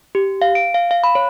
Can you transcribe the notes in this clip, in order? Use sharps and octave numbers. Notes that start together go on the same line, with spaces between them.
G4
F5
D7
F5
F5
B5
C#5